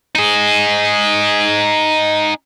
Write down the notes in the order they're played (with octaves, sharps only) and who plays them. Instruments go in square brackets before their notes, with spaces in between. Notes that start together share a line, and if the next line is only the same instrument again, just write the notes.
[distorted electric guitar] D#4 G#4